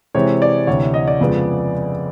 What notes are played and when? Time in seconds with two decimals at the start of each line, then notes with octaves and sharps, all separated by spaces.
0.15 C3 E3 G#3 C4 C#5
0.42 D5
0.67 D2 C3 E3 C#5
0.94 D#5
1.08 D5
1.21 F2 C#3 F3 G#3 B3